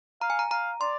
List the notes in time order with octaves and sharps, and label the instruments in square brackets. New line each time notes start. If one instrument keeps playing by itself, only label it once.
[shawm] F5 [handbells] A#5
[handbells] G#5
A#5
[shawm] F5 [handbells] A#5
[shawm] D5 [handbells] C6